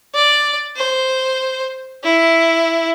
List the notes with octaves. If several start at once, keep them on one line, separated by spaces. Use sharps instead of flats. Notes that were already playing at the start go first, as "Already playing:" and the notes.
D5
C5
E4